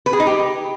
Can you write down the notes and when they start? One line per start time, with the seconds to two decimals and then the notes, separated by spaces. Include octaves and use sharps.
0.06 B4
0.13 G#4
0.20 D#4
0.27 G4